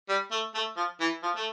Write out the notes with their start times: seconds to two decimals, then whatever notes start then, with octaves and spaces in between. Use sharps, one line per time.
0.09 G3
0.32 A3
0.54 A3
0.77 F3
1.00 E3
1.23 F3
1.36 A3